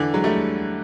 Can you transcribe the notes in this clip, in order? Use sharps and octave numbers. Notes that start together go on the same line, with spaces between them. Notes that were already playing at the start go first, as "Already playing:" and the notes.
Already playing: D3 E3
F#3 G#3
G3 A3